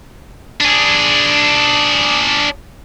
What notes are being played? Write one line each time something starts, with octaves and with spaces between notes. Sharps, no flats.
D4 G#4